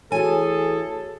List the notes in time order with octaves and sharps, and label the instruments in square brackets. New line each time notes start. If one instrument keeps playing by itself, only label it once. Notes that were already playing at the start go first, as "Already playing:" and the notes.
[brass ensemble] E3 A3 G#4 [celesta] F#4 C#5 [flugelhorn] A4 [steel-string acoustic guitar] G#5